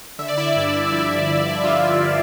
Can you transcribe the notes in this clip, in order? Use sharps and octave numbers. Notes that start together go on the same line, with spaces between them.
D3 E5
D5
E4 E5
G2
F3
G2
D3 F4